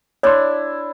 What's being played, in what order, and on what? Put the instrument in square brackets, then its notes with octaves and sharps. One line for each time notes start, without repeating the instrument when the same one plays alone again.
[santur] D4 E4 [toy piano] C#5 C6